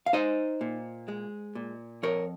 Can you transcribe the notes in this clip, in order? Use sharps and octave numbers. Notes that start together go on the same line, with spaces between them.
F5
D#4 C5 D#5
A#2
G#3
A#2
F2 A#4 C#5